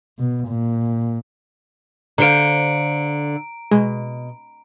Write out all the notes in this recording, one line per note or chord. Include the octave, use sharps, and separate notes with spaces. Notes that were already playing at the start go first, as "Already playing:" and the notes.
B2
A#2
D3 C5 F5 A#5 D7
B2 G#3